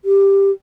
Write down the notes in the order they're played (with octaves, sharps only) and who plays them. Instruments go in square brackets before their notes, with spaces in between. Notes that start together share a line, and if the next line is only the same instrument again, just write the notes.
[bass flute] G4